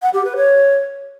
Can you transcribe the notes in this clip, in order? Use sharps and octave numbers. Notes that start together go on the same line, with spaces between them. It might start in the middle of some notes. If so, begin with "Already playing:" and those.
F#5
G4
B4
C#5